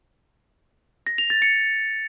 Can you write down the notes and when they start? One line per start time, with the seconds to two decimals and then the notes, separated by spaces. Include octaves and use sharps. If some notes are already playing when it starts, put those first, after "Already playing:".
1.07 A#6
1.18 F7
1.30 A6
1.42 C#7